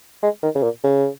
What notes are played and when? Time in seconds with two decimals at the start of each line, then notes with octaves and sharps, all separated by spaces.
0.23 G#3
0.43 D#3
0.55 C#3
0.63 A#2
0.83 C#3